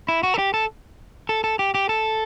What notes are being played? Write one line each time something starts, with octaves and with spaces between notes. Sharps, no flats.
E4
F#4
A4
G4
A4
A4
A4
G4
G4
A4